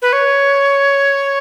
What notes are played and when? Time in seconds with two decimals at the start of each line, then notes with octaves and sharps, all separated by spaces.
0.02 B4
0.13 C#5